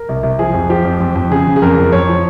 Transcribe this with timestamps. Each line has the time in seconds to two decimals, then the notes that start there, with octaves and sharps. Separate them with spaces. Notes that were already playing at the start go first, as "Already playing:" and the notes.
Already playing: A#4
0.09 C2
0.23 C2
0.39 F3 G#4
0.54 F2
0.69 F3 G4
0.85 F2
1.00 F2
1.15 F2
1.31 C#3 G#4
1.47 C#3
1.56 G#4
1.62 F2 A#4
1.77 F2
1.92 F2 C#5
2.09 F3